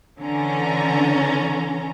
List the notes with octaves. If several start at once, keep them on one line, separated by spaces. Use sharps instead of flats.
D3 E3 C#4 A#5